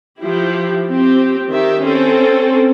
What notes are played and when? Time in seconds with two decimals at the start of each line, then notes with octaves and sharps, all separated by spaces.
0.20 F3 E4 G4
0.89 C4 G4
1.52 D#3 G4 E5
1.83 C4 C#4 A4